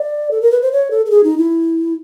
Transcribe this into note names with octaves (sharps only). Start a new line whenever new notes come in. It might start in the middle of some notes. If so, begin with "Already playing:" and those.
Already playing: D5
A4
A#4
B4
C5
C#5
A4
A4
G#4
D#4
E4